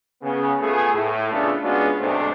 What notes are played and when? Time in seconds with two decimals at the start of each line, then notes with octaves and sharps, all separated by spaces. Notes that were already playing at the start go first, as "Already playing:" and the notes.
0.22 C#3 B3 C#4
0.60 A3 B3 F4 G#4
0.93 A2
1.31 C#3 A3 B3 D4 F4 A4
1.62 G#3 B3 C#4 D4 F4 F#4
2.00 B1 G#2 C3 A3 D4 C5